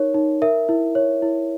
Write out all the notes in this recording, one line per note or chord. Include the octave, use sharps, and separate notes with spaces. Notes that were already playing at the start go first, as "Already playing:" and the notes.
Already playing: D#4 A#4 C#5
D#4
A#4 E5
E4
C#5
E4